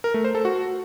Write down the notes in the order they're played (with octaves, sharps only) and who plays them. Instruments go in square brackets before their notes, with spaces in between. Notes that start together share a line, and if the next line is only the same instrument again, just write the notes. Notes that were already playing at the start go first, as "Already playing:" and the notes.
[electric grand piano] A#4
A3
C5
A4
F#4